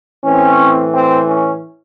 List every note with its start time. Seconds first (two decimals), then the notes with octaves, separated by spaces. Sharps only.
0.23 A2 E3 C4 C#4
0.93 C4
1.29 C#4